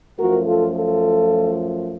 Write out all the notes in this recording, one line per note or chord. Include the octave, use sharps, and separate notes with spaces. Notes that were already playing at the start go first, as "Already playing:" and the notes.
F#2 F3 A3 F#4 A#4
F4 A4
F4 A4